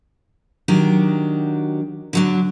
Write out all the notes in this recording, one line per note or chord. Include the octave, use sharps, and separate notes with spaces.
D#3 F#3 D4 F#4 G4
D3 F#3 D4